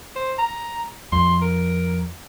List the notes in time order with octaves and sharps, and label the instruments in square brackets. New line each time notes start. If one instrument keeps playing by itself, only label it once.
[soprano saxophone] C5
A#5
[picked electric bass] F2 [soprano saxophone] C6
[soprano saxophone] A#4